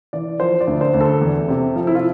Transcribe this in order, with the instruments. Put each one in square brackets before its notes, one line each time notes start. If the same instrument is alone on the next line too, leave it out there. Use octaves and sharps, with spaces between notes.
[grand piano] E3 D5
F3 C5
D5
D2
C5
D2
A4
E2
C3
F3
E4
F4